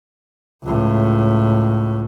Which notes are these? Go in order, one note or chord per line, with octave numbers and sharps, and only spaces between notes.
C#2 A2